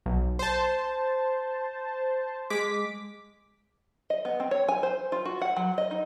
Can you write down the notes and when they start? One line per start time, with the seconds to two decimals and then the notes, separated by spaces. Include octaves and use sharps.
0.06 B1
0.39 C5 A5
2.50 G#3 D6 B6
4.10 D#5
4.25 B3
4.40 C4
4.51 C#5
4.69 G#5
4.83 C5
5.12 F4
5.25 F#4
5.42 F#5
5.56 F#3
5.78 D#5
5.91 D#4